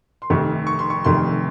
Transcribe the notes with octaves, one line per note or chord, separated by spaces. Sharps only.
C6
F1 F2 C3 D#3 A3 C#6
C#6
C6
C#6
F1 F2 C3 D#3 A3 C6